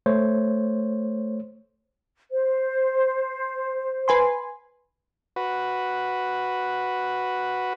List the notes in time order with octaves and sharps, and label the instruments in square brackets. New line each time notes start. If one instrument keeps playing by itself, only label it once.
[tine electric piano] A3 C5 C#5
[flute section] C5
[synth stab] B4 G#5 C6
[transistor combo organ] F#4 B4